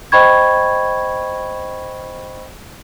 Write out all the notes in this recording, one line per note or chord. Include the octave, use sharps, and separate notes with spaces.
C5 D#5 G5 B5 C#6 G#6